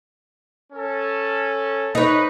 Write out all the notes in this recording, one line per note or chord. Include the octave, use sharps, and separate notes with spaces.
C#4 A4
D#4 B4 C#5